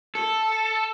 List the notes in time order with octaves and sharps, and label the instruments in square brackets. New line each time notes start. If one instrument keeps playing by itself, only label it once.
[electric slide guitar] A4